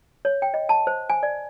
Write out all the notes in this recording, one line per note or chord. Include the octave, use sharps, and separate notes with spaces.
C#5
G5
D#5
A5
C5
G#5
D5